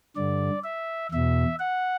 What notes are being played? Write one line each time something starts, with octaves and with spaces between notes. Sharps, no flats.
G2 D3 D5
E5
E2 B2 E5
F#5